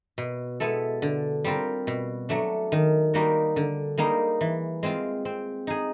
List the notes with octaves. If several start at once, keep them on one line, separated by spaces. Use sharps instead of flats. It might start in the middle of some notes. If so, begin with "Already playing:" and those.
B2
G#3 B3 E4 A4
D3
G3 C4 F4 A#4
B2
F#3 A3 D4
D#3
G3 A#3 D#4 F#4
D3
G3 A#3 D#4 G#4
E3
G#3 C4 F4
C4
D#4 G#4